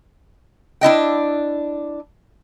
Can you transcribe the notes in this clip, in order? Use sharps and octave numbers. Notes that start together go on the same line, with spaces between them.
D4 E4 D#5 G5